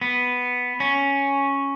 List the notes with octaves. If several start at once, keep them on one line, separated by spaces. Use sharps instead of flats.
B3
C#4